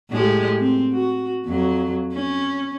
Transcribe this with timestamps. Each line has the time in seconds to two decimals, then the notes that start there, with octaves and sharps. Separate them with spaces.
0.11 A2 G#3 G4
0.60 C4
0.93 F#4
1.46 F2 F#3
2.14 C#4